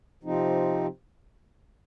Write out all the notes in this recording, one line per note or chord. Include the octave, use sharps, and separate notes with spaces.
C3 F3 C4 D#4